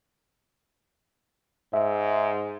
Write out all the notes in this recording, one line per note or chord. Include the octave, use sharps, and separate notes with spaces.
G#2 E5